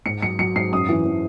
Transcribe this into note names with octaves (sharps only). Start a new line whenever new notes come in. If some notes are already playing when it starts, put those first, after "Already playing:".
G#2 C#7
F#3 C#7
F#3 C#7
G#2 C7
F#2 D#6
E3
E3